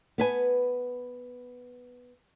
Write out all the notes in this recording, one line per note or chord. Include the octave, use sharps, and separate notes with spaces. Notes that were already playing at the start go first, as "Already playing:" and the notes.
B3 B4 G#5